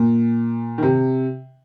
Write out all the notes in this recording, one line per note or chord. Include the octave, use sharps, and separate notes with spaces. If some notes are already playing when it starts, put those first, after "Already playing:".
Already playing: A#2
D#3
C3